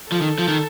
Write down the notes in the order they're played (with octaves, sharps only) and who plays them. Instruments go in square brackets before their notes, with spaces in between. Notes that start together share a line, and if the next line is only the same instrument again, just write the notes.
[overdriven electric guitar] F3 [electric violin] A4
[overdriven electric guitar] D#3
F3
D#3